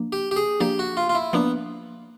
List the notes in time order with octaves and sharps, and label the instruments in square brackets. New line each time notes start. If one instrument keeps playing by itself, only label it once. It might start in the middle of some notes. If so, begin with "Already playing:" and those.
Already playing: [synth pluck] F3 A#3 D4
[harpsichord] G4
G4
G#4
[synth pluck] F3 A#3 D4 [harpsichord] G4
[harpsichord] F#4
F4
F4
E4
[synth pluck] F3 A#3 D4 [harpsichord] B3